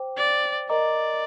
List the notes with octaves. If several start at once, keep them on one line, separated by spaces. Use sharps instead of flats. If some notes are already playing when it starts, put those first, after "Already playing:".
Already playing: C5 G5 D6
D5
A#4 D5 D#5 A#5 D6